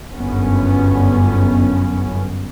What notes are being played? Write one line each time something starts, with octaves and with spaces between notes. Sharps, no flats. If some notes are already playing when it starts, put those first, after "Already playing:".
G1 F#2 B3 C#4